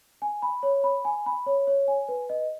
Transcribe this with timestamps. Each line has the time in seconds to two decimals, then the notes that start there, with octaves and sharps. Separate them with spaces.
0.22 G#5
0.42 B5
0.63 C#5
0.84 B5
1.05 G#5
1.26 B5
1.46 C#5
1.67 C#5
1.88 G#5
2.09 B4
2.29 D#5